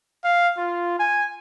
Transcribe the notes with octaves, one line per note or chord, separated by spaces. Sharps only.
F5
F4
G#5